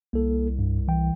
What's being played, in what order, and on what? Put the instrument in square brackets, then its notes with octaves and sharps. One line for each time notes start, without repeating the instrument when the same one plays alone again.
[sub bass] C2 [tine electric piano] A#3 A4
[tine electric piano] G2
E3 G5